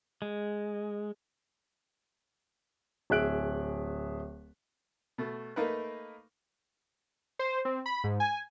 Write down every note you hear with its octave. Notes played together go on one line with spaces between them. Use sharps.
G#3
D1 G#4 E5 F#6 D7 F#7
B2 A3
A3 A#3 D#4 A#4 B4
C5
C4
B5
G#2
G#5